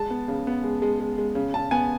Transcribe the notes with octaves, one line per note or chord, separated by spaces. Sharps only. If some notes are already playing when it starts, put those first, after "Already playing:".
Already playing: G#3 A5
B3
C#3
B3
G#3
G#3
G#3
G#3
C#3
C#3 A5
B3 G#5